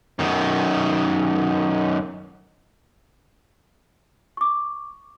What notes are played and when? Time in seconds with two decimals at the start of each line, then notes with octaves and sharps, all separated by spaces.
0.19 F#2 D#3
4.37 C#6 D6